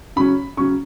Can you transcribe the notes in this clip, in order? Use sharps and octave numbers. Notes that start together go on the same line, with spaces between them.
C#3 F#3 C#4 B5
C#3 F#3 C#4 C#6